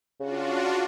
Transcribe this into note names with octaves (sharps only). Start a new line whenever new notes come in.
C#3 D4 F4 F#4